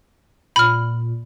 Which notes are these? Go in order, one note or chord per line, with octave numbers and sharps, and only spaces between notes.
A#2 B5 F6